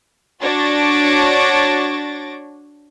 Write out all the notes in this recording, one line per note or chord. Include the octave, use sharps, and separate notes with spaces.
D4 F#4 C#5 A6 A#6 D7